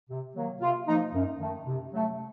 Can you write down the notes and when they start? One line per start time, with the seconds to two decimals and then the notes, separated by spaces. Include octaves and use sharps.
0.10 C3
0.36 D#3 F#3 A#3
0.61 C3 F4
0.87 F3 A#3 D#4
1.14 F#2
1.40 D#3 A3
1.66 C3
1.93 F#3 A3